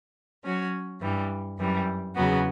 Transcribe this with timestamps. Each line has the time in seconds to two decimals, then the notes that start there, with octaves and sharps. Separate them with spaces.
0.44 F#3 C#4 F#4 C#5
1.01 G2 E3 G3
1.58 F#2 E3 G3
2.15 E2 C#3 F#3 B3 F#4